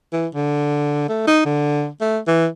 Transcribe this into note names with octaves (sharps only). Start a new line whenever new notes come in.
E3
D3
A3
D#4
D3
A3
E3